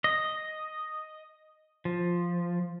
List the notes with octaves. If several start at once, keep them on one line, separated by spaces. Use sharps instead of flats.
D#5
F3